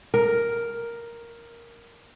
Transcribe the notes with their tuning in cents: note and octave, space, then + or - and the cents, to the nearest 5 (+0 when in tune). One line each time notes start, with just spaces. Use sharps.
A#4 +5